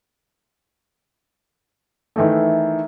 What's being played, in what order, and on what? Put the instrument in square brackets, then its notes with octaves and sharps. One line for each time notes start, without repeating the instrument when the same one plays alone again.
[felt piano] D#3 E3 A3